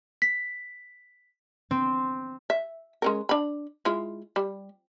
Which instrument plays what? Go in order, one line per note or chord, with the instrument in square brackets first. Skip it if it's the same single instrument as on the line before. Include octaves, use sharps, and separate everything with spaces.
[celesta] B6
[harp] C4
[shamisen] E5
G#3 C#4 A#4
D4 B5
G#3 E4 F4
G3